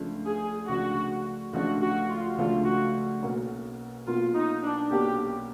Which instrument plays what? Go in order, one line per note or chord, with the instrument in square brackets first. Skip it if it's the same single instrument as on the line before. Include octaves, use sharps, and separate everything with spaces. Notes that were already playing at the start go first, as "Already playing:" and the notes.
Already playing: [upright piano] C#2 C#3 F3 A3 D4
[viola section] G#4
[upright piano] C#2 C#3 F3 A3 D4 [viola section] F#4
[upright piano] C#2 C#3 F3 A3 D4 [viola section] F#4
[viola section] F#4
F4
[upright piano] C#2 C#3 F3 A3 D4 [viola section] F4
[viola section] F#4
[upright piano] B1 B2 F#3 A#3 C#4
[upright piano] B1 B2 F#3 A#3 C#4 [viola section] F4
[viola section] D#4
D4
[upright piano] B1 B2 F#3 A#3 C#4 [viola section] G4